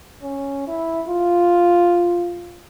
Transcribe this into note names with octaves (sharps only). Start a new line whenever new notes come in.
C#4
E4
F4